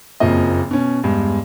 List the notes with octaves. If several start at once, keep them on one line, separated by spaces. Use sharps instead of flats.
F#1 F2 F3 A#3 D#5
B2 C#4
E2 G2 G#3